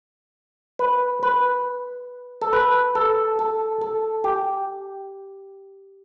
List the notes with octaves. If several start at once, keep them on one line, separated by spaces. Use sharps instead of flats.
B4
B4
A4
B4
A4
A4
A4
G4